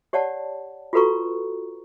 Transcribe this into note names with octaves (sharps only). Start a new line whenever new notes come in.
G4 C#5 D5 F#5 A5
F4 F#4 A4 B4 A#5 C#6